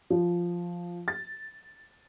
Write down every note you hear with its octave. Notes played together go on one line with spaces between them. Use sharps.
F3
A6